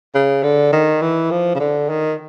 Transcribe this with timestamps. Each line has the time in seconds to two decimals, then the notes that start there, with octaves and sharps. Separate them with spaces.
0.15 C#3
0.43 D3
0.73 D#3
1.02 E3
1.31 F3
1.55 C#3
1.60 D3
1.89 D#3